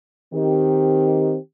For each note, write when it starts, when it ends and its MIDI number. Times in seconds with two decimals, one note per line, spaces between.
0.34 1.37 51
0.34 1.37 60
0.34 1.37 67